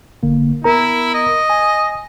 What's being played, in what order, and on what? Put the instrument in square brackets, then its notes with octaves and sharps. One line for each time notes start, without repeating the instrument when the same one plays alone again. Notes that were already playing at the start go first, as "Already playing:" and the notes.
[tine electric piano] G1 D3 A#3
[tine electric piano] B3 A#4 A#5 [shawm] E4
[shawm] D#5
[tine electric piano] G#5